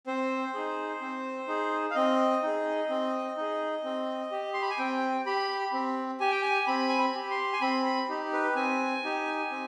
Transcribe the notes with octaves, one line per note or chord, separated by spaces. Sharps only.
C4 C5
D#4 G#4
C4
D#4 G#4
F5
C4 D#5
D#4 G#4
C4
D#4 G#4
C4
G4
C6
B5
G#5
C4 G5
G4 B5
C4
G4 G#5
G5
G#5
C4 B5
G#5
B5
G4
C6
G#5
C4 B5
B5
D#4 G4
B4
C4 G#5
D#4 G4
C4